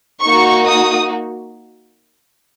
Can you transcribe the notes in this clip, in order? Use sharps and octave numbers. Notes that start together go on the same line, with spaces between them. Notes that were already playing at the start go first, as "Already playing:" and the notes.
A#3 D#4 F#4 C#6
D#6